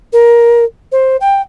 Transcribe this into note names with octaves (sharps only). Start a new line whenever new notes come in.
A#4
C5
G5